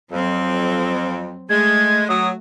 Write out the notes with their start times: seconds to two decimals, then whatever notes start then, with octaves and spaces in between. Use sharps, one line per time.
0.12 F2 F#3 C4
1.50 G#3 A3 G#6
2.09 F#3 D#6